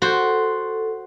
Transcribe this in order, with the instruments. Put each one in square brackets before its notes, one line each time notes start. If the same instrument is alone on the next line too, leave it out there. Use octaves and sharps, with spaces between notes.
[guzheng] F#4 C5 [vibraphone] A4